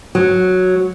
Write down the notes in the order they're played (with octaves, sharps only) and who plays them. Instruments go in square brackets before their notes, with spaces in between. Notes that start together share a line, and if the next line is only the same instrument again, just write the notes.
[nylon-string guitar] F#3